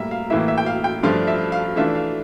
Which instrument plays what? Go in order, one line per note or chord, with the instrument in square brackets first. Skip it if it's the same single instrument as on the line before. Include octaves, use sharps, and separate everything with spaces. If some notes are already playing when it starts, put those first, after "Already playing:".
Already playing: [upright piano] A2 G3 A#3 E5 A#5
F5
A2 E3 A#3 E4 E5
E5
G5
F5
G5
G2 F3 A3 D4 F4 F5
E5
F5
E3 A3 D4 F4 E5
F5